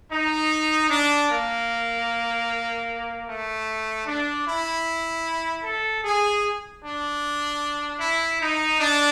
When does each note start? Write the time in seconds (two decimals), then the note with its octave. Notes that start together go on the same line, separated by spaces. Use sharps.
0.12 D#4
0.90 D4
1.31 A#3
3.28 A3
4.06 D4
4.45 E4
5.64 A4
6.04 G#4
6.83 D4
8.01 E4
8.41 D#4
8.80 D4